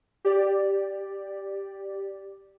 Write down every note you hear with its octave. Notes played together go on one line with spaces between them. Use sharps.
G4 D5